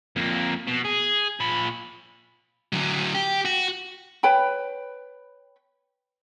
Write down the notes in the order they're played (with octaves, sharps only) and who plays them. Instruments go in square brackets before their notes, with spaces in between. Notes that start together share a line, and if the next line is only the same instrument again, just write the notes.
[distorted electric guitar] F2 A#3
B2
G#4
A#2 B5
[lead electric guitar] D3 F#3
G4
F#4
[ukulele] B4 C#5 G5 B5